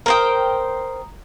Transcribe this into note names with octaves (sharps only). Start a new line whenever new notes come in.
A#4 C5 G5 A#5 D#6